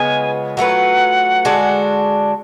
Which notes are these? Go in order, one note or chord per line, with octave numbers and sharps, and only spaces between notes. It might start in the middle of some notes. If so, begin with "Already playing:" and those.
Already playing: C#3 G#3 B3 F4 G#5
F#3 A3 F4 B4 F#5
D3 G#3 D4 F#4